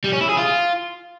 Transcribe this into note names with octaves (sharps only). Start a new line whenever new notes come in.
G3
C#4
E4
G#4
F4